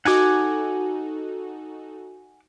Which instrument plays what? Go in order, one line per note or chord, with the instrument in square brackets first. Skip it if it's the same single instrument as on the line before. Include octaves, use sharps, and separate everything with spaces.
[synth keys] D#4 F#4 A4 [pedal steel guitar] F#5 G#5 D6